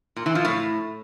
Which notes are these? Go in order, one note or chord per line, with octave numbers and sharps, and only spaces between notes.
A#2
E3
F3
A2